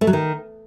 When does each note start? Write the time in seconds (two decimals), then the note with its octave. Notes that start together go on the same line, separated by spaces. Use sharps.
0.01 A3
0.07 F#3
0.13 D#3